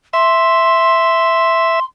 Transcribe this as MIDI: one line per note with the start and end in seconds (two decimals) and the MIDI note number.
0.13 1.79 76
0.13 1.84 84